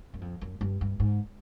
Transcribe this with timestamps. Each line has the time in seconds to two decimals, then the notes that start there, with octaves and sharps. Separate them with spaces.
0.14 F#2
0.21 F2
0.41 F#2
0.61 G2
0.81 G2
1.00 G#2